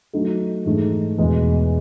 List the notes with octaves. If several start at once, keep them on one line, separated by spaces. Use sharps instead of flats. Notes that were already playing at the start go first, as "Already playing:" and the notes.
F#3 A3 D#4 A4
G#2 E3 A3 D#4 G#4
E2 B2 G#3